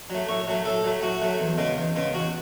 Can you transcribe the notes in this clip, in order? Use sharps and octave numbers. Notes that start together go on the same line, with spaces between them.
F#3 A3
A2 C#5
F#3 A3
A2 A4
F#3 A3
A2 F#4
F#3 A3
E2
C#3 G#3 B3
E2
C#3 G#3 B3
E2 F#4